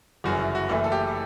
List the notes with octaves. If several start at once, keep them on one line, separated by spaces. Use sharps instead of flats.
G1 F#2 C#3 E3 F#4
E4
F#4
F#1 F#2 E3 A3 E4
A4
G4